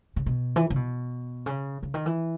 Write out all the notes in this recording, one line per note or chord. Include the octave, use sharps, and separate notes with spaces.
C#3
B2
E3
C#3
B2
C#3
C#3
D#3
E3